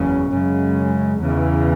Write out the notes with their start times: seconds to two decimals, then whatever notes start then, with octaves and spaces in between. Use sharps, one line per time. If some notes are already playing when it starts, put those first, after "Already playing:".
Already playing: F#1 E2 C#3 F#3 C#4
0.32 F#2 C#3 G#3
1.20 E2 C#3 E3